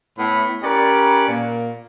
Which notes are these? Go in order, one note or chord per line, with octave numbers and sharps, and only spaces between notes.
A2 B3 B5
C#4 G4 A#4 B4 D5 B5
A#2 A#3